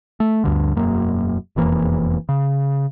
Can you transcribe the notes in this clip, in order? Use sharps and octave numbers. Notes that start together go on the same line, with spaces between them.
A3
D2 G2 D3
E1 F#2 A#3
E1 F2 E3 A#3
C#3